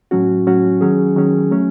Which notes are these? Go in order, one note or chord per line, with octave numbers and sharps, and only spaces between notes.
A2 F#3 C#4 F#4
A2 F#3 C#4 F#4
D#3 F#3 C#4 G#4
D#3 F#3 C#4 G#4
F#3 A3 C#4